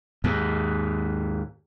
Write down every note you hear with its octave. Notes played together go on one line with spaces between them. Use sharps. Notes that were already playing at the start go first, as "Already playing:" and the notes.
D#2 G#2